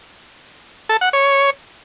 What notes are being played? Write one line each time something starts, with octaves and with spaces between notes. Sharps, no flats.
A4
F#5
C#5